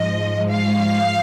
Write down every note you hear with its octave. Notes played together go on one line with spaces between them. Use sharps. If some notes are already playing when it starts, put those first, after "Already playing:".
Already playing: G#2 F3 G#3 D#5
F5